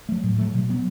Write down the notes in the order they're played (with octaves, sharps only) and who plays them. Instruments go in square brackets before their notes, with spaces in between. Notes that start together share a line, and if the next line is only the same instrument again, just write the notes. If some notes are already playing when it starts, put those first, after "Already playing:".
[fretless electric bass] F#3 A3
A2
F#3 A3
B2
F#3 B3